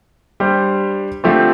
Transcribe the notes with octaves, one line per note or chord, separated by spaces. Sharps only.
G3 D4 G4 C5
D3 F3 A3 C4 G4